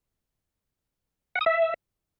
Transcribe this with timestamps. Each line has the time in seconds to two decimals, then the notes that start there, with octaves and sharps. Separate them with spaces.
1.35 F#5
1.41 D#6
1.46 E5